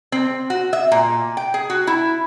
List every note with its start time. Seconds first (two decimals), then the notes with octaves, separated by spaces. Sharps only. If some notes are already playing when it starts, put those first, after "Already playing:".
0.12 C4
0.50 F#4
0.73 E5
0.92 A#2
1.37 G5
1.54 G#4
1.70 F#4
1.87 E4